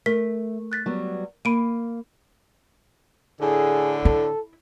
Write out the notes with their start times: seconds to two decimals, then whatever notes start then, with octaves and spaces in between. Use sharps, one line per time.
0.06 A3 A#4 B6
0.72 F#6 A6 B6
0.86 F#3 G3 B3
1.45 A#3 B5 D7 D#7
3.41 A2 D3 G#4
4.05 E4 A4